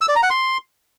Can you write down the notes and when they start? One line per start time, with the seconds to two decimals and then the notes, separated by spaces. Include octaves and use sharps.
0.01 E6
0.08 D5
0.16 A#5
0.23 F#5
0.30 C6